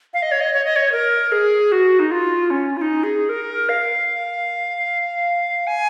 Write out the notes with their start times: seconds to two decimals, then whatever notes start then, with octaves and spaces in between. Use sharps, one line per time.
0.14 F5
0.22 D#5
0.31 C#5
0.41 D#5
0.53 C#5
0.65 D#5
0.76 C#5
0.92 A#4
1.32 G#4
1.72 F#4
1.99 D#4
2.11 F4
2.50 C#4
2.77 F4
2.81 D#4
3.03 G#4
3.29 A#4
3.69 F5
5.67 G#5